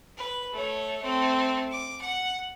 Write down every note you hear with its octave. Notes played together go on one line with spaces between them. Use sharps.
B4
A3 C#5
A3 C4
D6
F#5